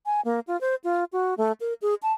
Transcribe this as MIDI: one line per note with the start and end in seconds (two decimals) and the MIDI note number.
0.06 0.21 80
0.25 0.40 58
0.47 0.59 65
0.61 0.75 72
0.84 1.04 65
1.13 1.34 66
1.38 1.52 57
1.60 1.73 70
1.82 1.94 68
2.03 2.12 81